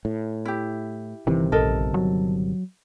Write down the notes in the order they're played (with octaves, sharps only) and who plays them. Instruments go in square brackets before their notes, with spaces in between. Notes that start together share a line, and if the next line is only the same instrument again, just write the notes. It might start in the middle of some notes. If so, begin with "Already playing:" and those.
[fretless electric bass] A2
[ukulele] E4 G4
[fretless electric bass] G1 C3 D#3 [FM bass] E3
[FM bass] A#1 [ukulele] A4 A#4 D#5
[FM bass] F#3